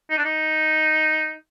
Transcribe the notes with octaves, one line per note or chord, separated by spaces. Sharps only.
D#4
D4
D#4